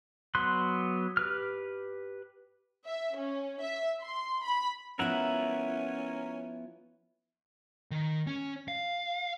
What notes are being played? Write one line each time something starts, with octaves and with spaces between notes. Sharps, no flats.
F#3 B3 C6 F#6
G4 B4 F6
E5
C#4
E5
C6
B5
F3 B3 C#4 E4 A#4 E5 F#5
D#3
C#4
F5